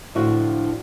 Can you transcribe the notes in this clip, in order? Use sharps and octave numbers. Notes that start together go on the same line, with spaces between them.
A2 D3 F3 D4 F4 F#4